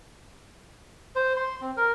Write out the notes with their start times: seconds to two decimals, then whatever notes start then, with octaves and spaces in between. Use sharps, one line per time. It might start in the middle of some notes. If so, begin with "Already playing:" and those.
1.16 C5
1.37 C6
1.61 C4
1.77 A#4